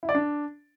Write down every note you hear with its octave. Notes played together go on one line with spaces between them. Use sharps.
E4
D5
D4